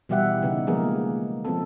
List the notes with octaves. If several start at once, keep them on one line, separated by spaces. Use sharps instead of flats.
B2 E3 G3 G4 E5 F#5
C#3 B3 D#4
F3 G#3 A#3 B3 G#4 A#4
F3 B3 C4 A4